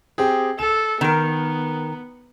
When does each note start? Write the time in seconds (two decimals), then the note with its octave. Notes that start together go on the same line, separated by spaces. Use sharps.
0.18 C4 G4 G#4
0.59 A4 E7
1.01 D#3 B3 A#4